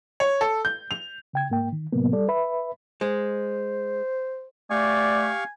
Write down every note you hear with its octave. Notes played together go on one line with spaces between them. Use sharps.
C#5
A4
G6
F7
C#3 G5 G#6
G#2 A#3 G5
D#3
A2 C3 F#3 A#3 B3
G3 A4 D5
B4 E5 B5
G#3 C5
A3 G4 D5 F5 G#5 C#6